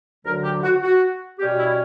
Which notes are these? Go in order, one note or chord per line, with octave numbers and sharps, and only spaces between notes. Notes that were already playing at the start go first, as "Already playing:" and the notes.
D2 D3 F#3 A#4
G4
F#4
F#4
B2 G3 C#4 G4
E4